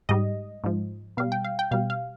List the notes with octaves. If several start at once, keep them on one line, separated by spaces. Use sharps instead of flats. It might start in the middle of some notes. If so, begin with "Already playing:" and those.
G#2 G3 D#5
G#2 F3
B2 G3 F5
G5
F5
G5
B2 G3 F5
F5